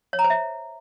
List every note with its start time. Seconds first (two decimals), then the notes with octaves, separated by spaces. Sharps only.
0.13 C#5
0.19 A#5
0.24 C5
0.30 E5